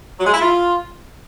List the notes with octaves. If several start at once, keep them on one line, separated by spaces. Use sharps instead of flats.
F#3
G#3
E4
F4